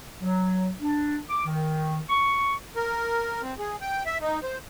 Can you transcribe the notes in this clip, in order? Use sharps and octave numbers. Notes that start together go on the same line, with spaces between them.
F#3
D4
D6
D#3
C#6
A#4
C4
G#4
G5
E5
D#4
C5